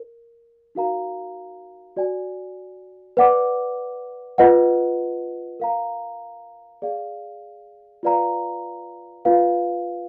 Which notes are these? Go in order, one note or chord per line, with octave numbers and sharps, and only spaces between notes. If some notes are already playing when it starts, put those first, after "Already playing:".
Already playing: A#4
D#4 F#4 A#4 F5 A#5
F#4 D5 G#5
B4 D5 F#5 D6
F4 B4 D#5 F#5
A#4 F5 A#5
G#4 D5 F5
F4 B4 D5 F5 A#5
F4 B4 F5